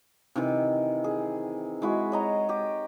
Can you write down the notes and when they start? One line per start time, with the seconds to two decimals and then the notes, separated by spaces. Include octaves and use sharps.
0.35 C3 D#3 E3
1.04 G#4
1.82 G#3 E4 F#4
2.12 C#5 D#5 A#5
2.49 G4 D#5